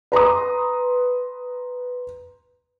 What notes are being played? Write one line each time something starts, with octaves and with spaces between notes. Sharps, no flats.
B4 A#5 C6 D#6